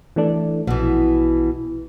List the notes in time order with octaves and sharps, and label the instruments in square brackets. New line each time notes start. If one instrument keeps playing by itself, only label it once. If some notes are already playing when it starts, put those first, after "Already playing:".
[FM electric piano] E3 A3 D4
[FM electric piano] A#1 [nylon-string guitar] B2 E3